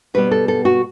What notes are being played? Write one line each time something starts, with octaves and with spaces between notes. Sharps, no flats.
B2 G3 B3 B4
A4
A4
F#4